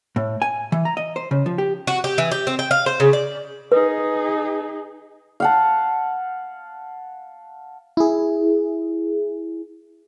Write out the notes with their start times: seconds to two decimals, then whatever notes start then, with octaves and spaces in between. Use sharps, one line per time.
0.16 A2
0.42 G#5
0.72 E3
0.85 A#5
0.97 D#5
1.16 C5
1.31 C#3
1.46 F3
1.58 G4
1.87 F#4
2.04 G4
2.18 E3
2.32 G4
2.47 C4
2.59 G5
2.71 F5
2.86 C5
3.00 C#3
3.13 D5
3.72 D#4 G#4 B4
5.40 F5 F#5 A5
7.97 E4 G#4